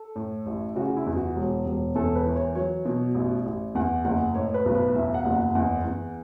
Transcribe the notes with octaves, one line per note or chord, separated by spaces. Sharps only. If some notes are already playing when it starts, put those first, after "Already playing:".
Already playing: A4
A2
A1
C#3 F#4
E4
E2
F#4
E1
E1
E2 A4
B4
E3
C#5
F#3 C#5
B2
A1
A1
E2 F#5
F#1 F#5
A2 C#5
B4
B1
B4
E2 E5
F#5
F#1
F#5
E2 F#5
E2